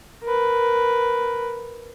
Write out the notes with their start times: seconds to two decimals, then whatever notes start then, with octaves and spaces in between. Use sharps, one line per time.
0.24 A#4 B4